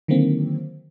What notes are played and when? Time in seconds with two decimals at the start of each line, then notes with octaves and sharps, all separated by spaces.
0.08 D3 D#3 F#3 A#3 C4